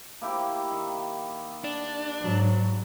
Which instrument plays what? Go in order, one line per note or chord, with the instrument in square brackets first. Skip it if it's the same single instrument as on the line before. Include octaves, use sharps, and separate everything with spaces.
[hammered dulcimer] A#3 E4 G4
D#3
[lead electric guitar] D4
[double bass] G#2 F#3